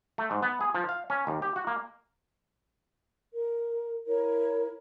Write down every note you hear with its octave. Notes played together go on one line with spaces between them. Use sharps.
A3
G#2
B3
G#4
F3
F5
C#4
D#2
G4
F#4
A#3
A#4
E4 A#4 C#5